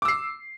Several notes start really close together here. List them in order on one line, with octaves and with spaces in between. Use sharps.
D6 E6 C7